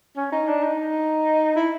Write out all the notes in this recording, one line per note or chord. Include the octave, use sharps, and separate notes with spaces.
C#4
D#4
D4
D#4
E4